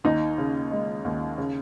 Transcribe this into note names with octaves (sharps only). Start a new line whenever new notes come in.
D#2 D#4
C#3
G#3
D#2
C#3